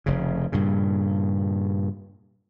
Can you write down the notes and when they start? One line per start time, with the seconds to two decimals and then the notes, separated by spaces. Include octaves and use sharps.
0.06 F1 C#3
0.52 G2 A#2 C#3